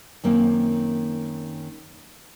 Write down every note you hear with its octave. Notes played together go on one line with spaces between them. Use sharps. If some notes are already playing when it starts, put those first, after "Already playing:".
F#2 D#3 A#3 C4